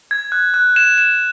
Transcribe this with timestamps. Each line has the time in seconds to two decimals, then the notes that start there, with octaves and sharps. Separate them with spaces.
0.11 G#6
0.32 F#6
0.54 F#6
0.76 E7
0.98 E7